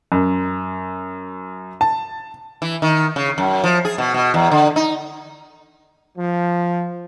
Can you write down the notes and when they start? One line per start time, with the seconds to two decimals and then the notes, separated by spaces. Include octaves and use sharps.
0.12 F#2
1.81 A5
2.62 E3
2.82 D#3
3.16 C#3
3.38 F#2
3.64 F3
3.85 G#4
3.98 B2
4.14 B2
4.34 E2
4.51 D3
4.76 D#4
6.17 F3